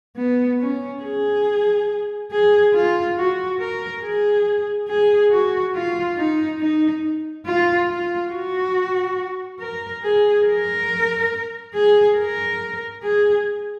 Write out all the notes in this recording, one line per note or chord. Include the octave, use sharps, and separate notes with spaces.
B3
C#4
G#4
G#4
F4
F#4
A#4
G#4
G#4
F#4
F4
D#4
D#4
F4
F4
F#4
A#4
G#4
A#4
G#4
A#4
G#4